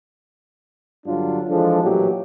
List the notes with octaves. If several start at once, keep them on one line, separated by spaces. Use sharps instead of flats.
G2 D3 F#3 D4 F4
E3 F3 G#3 D4 A4
A1 A#2 E3 F#3 G4